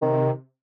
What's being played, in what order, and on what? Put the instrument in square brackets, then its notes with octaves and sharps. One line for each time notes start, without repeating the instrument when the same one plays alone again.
[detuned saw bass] C3 [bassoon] D#3